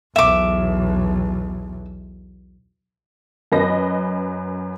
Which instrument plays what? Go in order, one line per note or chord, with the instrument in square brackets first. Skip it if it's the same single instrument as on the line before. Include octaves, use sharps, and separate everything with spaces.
[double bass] B1 E2 [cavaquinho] E5 D6
[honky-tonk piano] F#2 B4 D#5 A#6